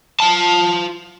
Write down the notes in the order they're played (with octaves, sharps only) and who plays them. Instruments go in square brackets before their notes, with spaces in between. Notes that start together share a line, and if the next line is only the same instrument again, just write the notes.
[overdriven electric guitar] F4 A5